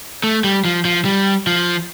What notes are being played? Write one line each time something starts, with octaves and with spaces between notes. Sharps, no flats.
A3
G3
F3
F3
G3
F3